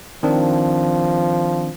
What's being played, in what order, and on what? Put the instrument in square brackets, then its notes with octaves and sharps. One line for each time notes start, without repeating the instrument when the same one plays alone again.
[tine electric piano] D#3 C4 D4 [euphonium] F3